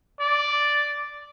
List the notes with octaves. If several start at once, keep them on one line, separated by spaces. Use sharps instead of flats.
D5